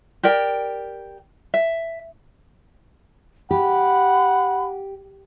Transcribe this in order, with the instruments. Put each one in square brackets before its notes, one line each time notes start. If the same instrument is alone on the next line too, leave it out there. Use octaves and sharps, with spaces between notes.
[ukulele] G4 A#4 D5 G5
E5
[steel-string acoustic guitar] G4 [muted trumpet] F#5 [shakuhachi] B5